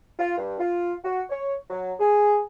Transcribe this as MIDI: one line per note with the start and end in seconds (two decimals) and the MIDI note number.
0.19 0.37 65
0.38 0.59 43
0.59 0.93 65
1.04 1.21 66
1.29 1.55 73
1.70 1.92 54
2.00 2.40 68